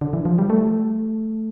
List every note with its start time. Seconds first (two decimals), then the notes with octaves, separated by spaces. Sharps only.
0.01 D3
0.13 E3
0.25 F3
0.39 G3
0.50 A3